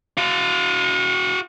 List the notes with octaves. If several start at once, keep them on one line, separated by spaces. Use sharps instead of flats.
F#4 F5